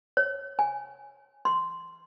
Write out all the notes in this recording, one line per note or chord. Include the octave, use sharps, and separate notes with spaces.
C#5
G#5
C6